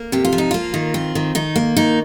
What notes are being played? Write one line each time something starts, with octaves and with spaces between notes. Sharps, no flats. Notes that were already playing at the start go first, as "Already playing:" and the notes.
Already playing: A#3
C3 G4
F4
F3
D#4
A#3 F4
D#3
C4
D#3
D#3 D#4
A#3
D#3 D#4